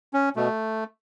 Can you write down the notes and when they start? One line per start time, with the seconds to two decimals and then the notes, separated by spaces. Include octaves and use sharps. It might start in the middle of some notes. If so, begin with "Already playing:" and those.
0.13 C#4
0.36 B2 A3